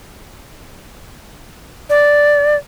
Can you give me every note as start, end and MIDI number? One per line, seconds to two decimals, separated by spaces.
1.90 2.56 74